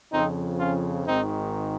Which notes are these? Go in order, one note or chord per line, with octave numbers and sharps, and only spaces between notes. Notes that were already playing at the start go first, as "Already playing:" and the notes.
F2 C#3 F3 C4 D#4
C#4 F4
G#1 G#2 D#3 C4 D#4